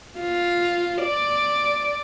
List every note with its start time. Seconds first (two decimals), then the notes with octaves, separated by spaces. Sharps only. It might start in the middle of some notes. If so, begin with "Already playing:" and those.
0.19 F4
1.02 D5